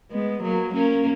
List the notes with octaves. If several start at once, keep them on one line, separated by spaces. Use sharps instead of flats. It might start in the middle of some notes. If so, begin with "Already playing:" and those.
G#3 B3
F#3 A#3
A#3 C#4